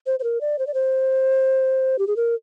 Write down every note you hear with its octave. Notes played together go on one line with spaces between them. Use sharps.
C5
C5
A#4
D5
C5
D5
C5
G4
G#4
A#4